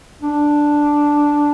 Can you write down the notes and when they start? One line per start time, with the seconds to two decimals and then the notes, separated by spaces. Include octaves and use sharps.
0.21 D4